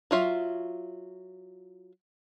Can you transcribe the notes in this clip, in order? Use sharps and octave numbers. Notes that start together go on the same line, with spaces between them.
F#3 F4 E5